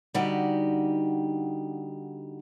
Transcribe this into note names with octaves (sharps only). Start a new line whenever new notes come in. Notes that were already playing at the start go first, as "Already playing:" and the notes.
D3 G3 D#4 F#4 G4 D5